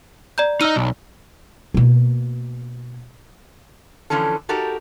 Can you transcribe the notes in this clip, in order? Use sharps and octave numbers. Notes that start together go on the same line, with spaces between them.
D5 A#5 G6
D#4 D#5 E6 F6 D#7
B1
B2 A#3
D3 E3 F3 C#4 A4
D#4 F#4 G4 A4 A#4